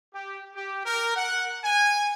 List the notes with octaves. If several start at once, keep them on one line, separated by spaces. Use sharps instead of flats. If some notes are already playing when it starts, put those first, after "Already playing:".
G4
G4
A#4
F#5
G#5